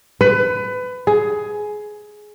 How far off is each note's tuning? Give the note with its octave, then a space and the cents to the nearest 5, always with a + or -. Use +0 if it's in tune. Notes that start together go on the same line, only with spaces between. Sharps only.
B4 +25
G#4 +15